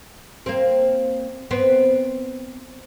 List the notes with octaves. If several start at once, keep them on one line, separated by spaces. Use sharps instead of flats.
A#3 C4
B3 C4